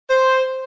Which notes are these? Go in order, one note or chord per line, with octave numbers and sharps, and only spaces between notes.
C5